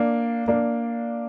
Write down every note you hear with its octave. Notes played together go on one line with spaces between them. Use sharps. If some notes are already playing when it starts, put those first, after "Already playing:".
Already playing: A#3 D4
A#3 D4